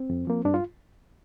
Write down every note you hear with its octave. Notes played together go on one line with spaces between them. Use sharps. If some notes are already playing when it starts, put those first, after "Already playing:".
Already playing: C4
F2
F3 A#3
G2 D4
F4